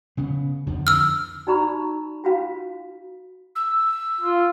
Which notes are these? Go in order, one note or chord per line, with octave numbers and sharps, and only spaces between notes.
C#3 B3
F2 D3 F3
E6 F6
D#4 F#4 D5 A#5 B5 C#6
F4 F#4 F5
E6
F4